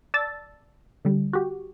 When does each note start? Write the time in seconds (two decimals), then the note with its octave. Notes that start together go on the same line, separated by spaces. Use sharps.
0.14 D5 A5 E6 A6
1.05 D3 G3
1.33 F#4 G4